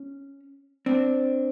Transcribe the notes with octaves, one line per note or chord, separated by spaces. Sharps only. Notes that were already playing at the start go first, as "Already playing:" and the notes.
Already playing: C#4
C4 D4